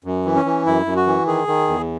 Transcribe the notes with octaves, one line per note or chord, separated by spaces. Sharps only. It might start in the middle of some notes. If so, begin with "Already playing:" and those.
F#2
E3
C#4
E3
F#2 E4
F#2
F#4
E3
D#3 G#4
D#3
E2